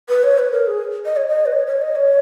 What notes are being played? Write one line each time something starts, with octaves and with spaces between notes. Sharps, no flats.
B4
C#5
B4
A#4
G#4
D#5
C#5
D#5
B4
C#5
C#5
D#5
C#5